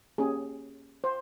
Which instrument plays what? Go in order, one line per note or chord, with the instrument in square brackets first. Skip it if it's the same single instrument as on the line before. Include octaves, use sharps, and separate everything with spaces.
[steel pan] A#3 C#4 G4 G#4
C5